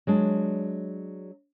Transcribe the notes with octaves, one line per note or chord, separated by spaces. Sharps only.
F#3 G#3 D4